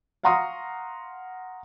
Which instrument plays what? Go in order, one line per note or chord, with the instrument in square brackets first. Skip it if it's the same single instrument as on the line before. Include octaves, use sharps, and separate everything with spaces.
[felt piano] F5 F#5 A#5 C6 C#6 D#6